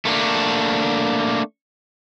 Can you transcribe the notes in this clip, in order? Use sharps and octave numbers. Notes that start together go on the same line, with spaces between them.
A3 A#3 D4